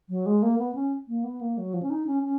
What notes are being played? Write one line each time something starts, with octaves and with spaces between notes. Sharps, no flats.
F#3
G#3
A#3
B3
C#4
A#3
B3
A#3
F#3
F3
C#4
D#4
C#4
C#4